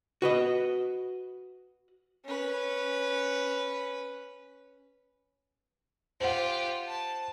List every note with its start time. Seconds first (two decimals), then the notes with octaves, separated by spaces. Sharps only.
0.22 F#4 B4 D#5
2.25 C#4 B4
6.20 F4 G4 C5 F#5
6.87 A5